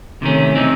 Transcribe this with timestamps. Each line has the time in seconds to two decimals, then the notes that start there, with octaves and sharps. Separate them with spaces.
0.22 C3 D#3 A3 C#4
0.55 C3 E3 C4 D#4